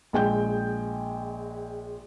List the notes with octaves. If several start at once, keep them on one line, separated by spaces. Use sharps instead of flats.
A#1 G#3 G5 G6